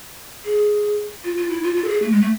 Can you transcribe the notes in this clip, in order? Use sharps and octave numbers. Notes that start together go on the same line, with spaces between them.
G#4
F4
F4
E4
F4
F4
A4
G#4
A3
G#3
A3